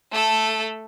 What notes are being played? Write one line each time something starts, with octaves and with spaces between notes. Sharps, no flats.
A3 A4